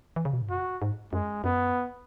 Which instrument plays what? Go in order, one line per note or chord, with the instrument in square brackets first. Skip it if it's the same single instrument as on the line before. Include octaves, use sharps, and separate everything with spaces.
[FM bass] E3
C#3
B2
G#2
[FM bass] F#2 [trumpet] F#4
[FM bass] G#2
[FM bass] F#2 [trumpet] G#3
[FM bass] F#2 [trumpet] B3